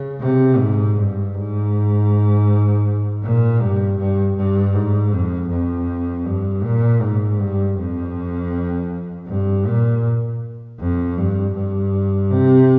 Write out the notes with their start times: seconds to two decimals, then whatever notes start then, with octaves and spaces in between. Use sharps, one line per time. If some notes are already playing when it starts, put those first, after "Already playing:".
Already playing: C#3
0.21 C3
0.58 G#2
0.96 G2
1.34 G#2
3.23 A#2
3.61 G2
3.99 G2
4.36 G2
4.74 G#2
5.12 F2
5.50 F2
6.25 G2
6.63 A#2
7.01 G#2
7.39 G2
7.77 F2
9.27 G2
9.66 A#2
10.79 F2
11.17 G2
11.55 G2
12.30 C3